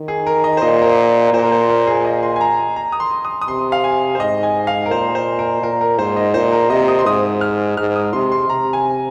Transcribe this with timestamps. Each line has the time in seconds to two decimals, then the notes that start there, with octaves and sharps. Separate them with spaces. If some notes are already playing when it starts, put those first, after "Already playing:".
Already playing: D#3
0.08 G#4
0.27 A#4
0.44 D#5
0.57 C5
0.62 A#2 D#5
0.82 A#4
0.85 C5
1.27 A#4
1.33 A#2 C5
1.42 A#4
1.52 C5
1.69 A#4
1.87 G#4
2.05 D#5
2.23 C6
2.36 G#5
2.41 A#5
2.76 A#5
2.92 D#6
3.00 C6
3.25 D#6
3.41 D#6
3.48 C3 C6
3.72 F5
3.84 G#5
4.15 C5
4.19 G#2 D#5
4.43 G#5
4.67 F5
4.86 A#4
4.91 A#2 C5
5.15 C5
5.39 A#4
5.62 A#2 A#4
5.81 A#4
5.98 G#2 C5
6.17 D#5
6.34 A#2 C5
6.52 A#4
6.70 C3 D#5
6.88 D#6
6.99 C6
7.06 G#2 D#6
7.41 F6
7.77 G#2 F6
7.96 D#6
8.13 C3 C6
8.32 C6
8.49 C3 A#5
8.73 G#5